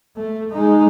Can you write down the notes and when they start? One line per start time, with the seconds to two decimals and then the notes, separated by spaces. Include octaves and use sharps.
0.16 A3
0.52 G#3 D#4